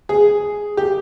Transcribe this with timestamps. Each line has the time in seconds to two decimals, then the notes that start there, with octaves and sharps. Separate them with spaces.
0.09 G#4
0.77 G4